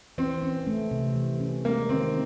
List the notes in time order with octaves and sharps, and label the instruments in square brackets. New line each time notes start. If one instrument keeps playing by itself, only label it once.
[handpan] E3 [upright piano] C4
[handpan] C#4
A3
C3
E3
C#4
[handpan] G#3 [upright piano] A#3
[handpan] D#3 [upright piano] C4